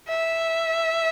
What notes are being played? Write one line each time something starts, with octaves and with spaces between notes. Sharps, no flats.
E5